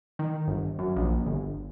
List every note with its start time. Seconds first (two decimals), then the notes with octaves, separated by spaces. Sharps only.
0.19 D#3
0.47 G1
0.79 F#2
0.96 A#1
1.26 G1